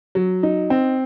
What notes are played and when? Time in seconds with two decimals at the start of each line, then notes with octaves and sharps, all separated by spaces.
0.15 F#3
0.43 D#4
0.70 C4